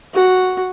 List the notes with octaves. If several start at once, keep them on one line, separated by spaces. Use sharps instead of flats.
F#4